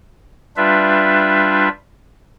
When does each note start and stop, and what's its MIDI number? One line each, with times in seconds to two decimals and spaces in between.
0.57 1.69 55
0.57 1.69 62
0.57 1.69 65
0.57 1.69 71
0.57 1.69 76